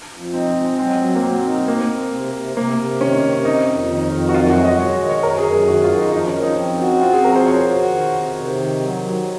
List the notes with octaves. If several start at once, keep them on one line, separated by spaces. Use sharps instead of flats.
F2
C4 D#4
G#3
F#3 C4
F#3
A#3
F#3 C4
D#4
A#3 C4
C4
C3
C3
C3 A#3
C3
D#3 C#4
C3
D#3 D#4
F2
D#3
F2
F#4
F#2 F4
F#4
G#3
D#5
G#3 C#5
D#3
C#5
F#2 A#4
G#4
F#2
G#4
D#3 F#4
F4
D#3
D#4
F3 D#4
C#4
F3
D#4
C4
F#4
C4 F4
G#4
F3 A#4
C5
F#4 C#5
F#4
D#3
C3
C3
D#3
F#3
F#3